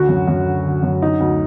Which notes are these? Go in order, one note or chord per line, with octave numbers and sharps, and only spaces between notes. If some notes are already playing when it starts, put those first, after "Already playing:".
Already playing: D2 D3 F#4
F#2
F#2
D3
D3
F#2
D3 D#4
D2